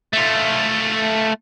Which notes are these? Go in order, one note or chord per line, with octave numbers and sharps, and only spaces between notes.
A3 F4